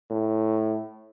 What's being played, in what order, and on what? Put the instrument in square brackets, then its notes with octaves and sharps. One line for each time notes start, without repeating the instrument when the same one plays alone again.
[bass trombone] A2